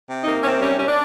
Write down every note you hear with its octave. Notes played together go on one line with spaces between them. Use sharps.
C3
A#3 D#4
C3 C4 C#4
G3 C#4
G3 C#4
D4